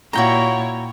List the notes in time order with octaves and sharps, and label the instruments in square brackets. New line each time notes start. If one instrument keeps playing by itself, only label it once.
[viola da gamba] A#2 E4 C#5 [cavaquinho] F#4 G5 A#5